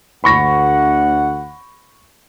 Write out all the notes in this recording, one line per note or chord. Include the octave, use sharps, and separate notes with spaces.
D2 F#5 B5 C#6 A#6